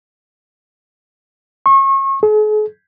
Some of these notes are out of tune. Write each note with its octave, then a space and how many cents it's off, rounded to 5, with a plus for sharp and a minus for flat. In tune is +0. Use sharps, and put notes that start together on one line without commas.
C#6 -35
G#4 +45